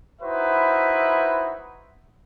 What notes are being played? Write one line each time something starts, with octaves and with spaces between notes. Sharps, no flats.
D#4 E4 F#4 B4 C5 E5